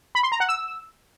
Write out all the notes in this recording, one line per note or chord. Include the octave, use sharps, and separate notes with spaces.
B5
C6
A#5
F#5
E6